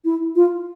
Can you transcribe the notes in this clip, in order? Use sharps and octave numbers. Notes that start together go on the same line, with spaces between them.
E4
F4